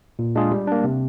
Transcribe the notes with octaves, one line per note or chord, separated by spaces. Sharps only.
A#2
G#3 D4 F4 G#4
G3
A#3 D4
C3